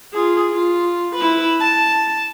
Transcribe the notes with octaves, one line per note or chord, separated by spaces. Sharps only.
F4 G#4
F4
E4 B4
A5